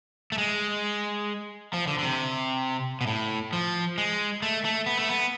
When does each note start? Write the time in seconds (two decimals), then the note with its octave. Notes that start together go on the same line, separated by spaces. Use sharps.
0.32 A3
0.38 G#3
1.74 F3
1.87 D3
1.99 D3
2.03 C3
3.01 B2
3.07 A2
3.53 F3
3.98 G#3
4.42 A3
4.65 A3
4.86 B3
4.97 A3
5.09 B3